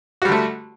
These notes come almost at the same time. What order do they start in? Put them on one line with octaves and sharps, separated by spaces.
F#4 G3 D3 A3